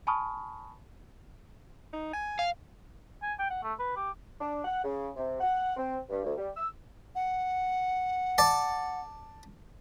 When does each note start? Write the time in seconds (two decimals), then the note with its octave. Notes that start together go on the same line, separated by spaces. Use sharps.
0.07 G#5 A5 B5 C#6 D#6 F6
1.93 D#4
2.13 G#5
2.39 F5
3.22 G#5
3.39 G5
3.50 F#5
3.63 A3
3.79 B4
3.96 G4
4.41 D4
4.65 F#5
4.84 C#3
5.16 C3
5.41 F#5
5.77 C4
6.10 G2
6.24 D2
6.38 G3
6.57 E6
7.15 F#5
8.38 D5 A5